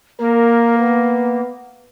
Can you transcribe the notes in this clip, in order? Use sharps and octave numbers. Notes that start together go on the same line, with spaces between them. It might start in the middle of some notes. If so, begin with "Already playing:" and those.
A#3 A#4
B3